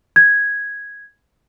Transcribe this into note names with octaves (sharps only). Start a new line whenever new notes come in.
G#6